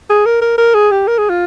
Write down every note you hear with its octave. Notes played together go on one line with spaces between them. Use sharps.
G#4
A#4
A#4
A#4
G#4
G4
A#4
G#4
F4